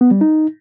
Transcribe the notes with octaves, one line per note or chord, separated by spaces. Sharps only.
B3
G3
D#4